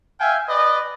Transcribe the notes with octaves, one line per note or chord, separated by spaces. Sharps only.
E5 F5 G5 G#5
B4 D5 D#5